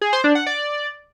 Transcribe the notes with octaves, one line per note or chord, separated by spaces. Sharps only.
G#4
C5
D4
F#5
D5